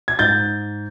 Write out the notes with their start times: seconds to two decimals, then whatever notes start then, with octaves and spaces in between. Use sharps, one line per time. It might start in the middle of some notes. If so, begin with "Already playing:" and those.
0.08 G#6
0.19 G#2 G6 A6